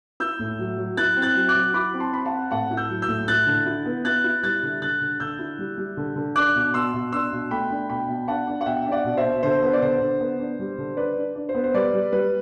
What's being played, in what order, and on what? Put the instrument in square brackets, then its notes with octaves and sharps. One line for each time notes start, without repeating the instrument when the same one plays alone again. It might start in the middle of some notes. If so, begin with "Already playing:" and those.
[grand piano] E4 E6 G6
A2
F#3
F#3
E4 F#6 A6
C4
F#6 A6
F#3
D6 F#6
F#3
E4 B5 D6
C4
A5 C6
C4 B5
F#5 A5
C4
A2 F#5 A5
E4
E6 G6
F#3
E6 G6
A2
E4 F#6 A6
D3
E4
B3
E4 F#6 A6
E4
G3 F#6 A6
D3
D3 F#6 A6
D3
D3 E6 G6
E4
G3
G3
D3
D3
D4 D6 F#6
B2
B2 C6 E6
B2
D4 C6 E6
B2
A3 G5 B5
D4
B2 G5 B5
B2
D4 F#5 A5
D4
F#5
B2 E5 G5
D4
D5 F#5
B2
C5 E5
B2
D3 C5
B3
D5
D3 C5
D3
B3
D4
G3
D3
D4 B4 D5
D4
D4
C5
B3
C5
G3 B4 D5
G3
G3 B4